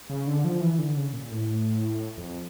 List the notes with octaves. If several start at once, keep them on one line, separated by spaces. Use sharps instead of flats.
C#3
D3
F3
E3
D3
C#3
A#2
A2
F2